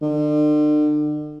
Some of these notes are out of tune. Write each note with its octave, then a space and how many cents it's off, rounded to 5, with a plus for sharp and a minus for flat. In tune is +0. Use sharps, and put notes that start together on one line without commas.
D3 +40